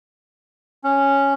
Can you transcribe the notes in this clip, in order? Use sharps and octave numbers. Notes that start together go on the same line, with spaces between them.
C#4